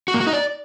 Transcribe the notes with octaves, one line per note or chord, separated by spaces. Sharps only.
F#4
A#3
F#4
D#4
D5